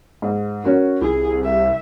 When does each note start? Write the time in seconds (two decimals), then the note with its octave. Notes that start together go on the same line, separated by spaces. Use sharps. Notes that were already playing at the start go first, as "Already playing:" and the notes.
0.22 G#2
0.64 C#4 F#4 A#4
1.01 C2 E4 G#4
1.44 E5